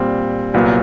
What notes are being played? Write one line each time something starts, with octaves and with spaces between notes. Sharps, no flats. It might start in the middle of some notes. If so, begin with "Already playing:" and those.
Already playing: A#2 G3 C4
C2 A#2 F#3 B3